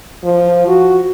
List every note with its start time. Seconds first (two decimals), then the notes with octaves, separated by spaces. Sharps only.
0.24 F3
0.68 F#4